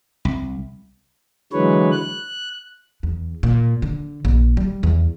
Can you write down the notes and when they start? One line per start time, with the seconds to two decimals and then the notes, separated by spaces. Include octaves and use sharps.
0.25 C2
1.53 D3 E3 F#3 G#3 B4 C#5
1.91 F#6
3.03 E2
3.43 A#2
3.82 D3
4.25 A#1
4.57 G3
4.83 E2